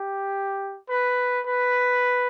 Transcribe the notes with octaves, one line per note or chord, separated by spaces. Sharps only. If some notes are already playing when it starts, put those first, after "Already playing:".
Already playing: G4
B4
B4